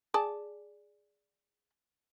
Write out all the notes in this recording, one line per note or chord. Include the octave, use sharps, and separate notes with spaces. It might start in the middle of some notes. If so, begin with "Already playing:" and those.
G#4 D5 A5